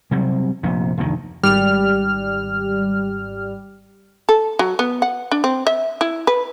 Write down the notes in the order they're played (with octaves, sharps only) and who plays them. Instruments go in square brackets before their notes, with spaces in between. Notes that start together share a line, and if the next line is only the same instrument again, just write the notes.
[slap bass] C3 F#3 G3
F1 A#1 C3
F1 D2 D#3
[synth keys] G#1 G3 F6
[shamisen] A4
F#3
B3
F#5
D4
C4
E5
E4
B4